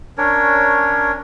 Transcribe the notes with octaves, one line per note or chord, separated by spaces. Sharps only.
C#4 D4 A#4 C#5